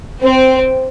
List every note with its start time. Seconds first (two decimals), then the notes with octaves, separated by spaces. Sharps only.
0.21 C4